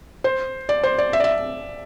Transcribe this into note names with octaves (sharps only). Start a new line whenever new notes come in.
C5
D5
C5
D5
E5
D5
E5